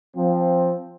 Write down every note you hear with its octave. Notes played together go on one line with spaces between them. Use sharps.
F3 C4